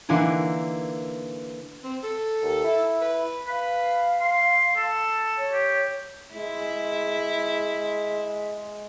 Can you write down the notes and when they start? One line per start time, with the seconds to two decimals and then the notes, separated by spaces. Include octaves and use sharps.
0.09 D3 E3 A#3 D#4
1.84 C4
2.03 A4
2.42 D#2
2.64 E4
3.01 B4
3.47 B4 F5
4.21 C6
4.76 A4
5.38 C#5
5.53 G4
6.34 G#3 E4